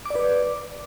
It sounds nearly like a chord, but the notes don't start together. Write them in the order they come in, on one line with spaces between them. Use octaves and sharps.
D6 D5 B4